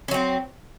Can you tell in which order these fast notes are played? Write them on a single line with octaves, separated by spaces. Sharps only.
C#4 F#3 C4